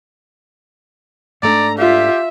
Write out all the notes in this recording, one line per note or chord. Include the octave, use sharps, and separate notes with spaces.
G#2 A3 D4 D5 A#5
F4 G4 E5